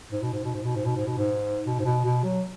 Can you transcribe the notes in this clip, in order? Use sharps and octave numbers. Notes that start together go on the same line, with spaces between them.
G#2
B2
G#2
B2
G#2
B2
G#2
B2
G#2
B2
G#2
B2
G#2
B2
B2
F#3